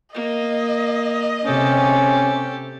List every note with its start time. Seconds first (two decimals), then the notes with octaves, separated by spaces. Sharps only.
0.14 A#3 D#5
1.45 C3 C#4 G4 A4